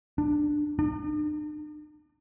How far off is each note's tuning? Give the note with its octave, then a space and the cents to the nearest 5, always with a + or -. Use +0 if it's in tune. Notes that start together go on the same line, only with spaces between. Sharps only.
D4 +15
D4 +45